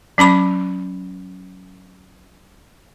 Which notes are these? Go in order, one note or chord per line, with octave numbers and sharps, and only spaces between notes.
F#3 C#4 B5 D6